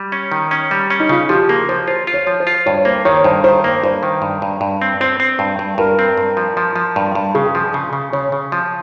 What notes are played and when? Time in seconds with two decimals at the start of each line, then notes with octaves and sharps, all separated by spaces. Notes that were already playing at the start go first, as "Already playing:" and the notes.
Already playing: G3
0.12 C#4
0.32 D#3
0.51 C#4
0.71 G3
0.90 C#4
0.99 D#4
1.09 C#3 F4
1.29 F3 G4
1.49 A#3 G#4
1.69 F3 C5
1.87 F4 C5
2.07 F4
2.14 C#5
2.27 F3
2.40 C5
2.47 F4
2.66 G2 C#5
2.85 A#3 C5
3.05 D#3 C#5
3.24 G2 C5
3.44 D#3 C5
3.64 A#3
3.83 G2 C5
4.03 D#3
4.22 G2
4.42 G2
4.61 G2
4.82 C4
5.01 C4 C5
5.20 C4
5.39 G2
5.59 G2
5.78 G2 A#4
5.99 C4
6.17 G2
6.37 F3
6.57 F3
6.76 F3
6.96 G2
7.15 G2
7.35 C#3 G#4
7.55 F3
7.74 C#3
7.93 C#3
8.13 C#3 C#5
8.32 C#3
8.52 F3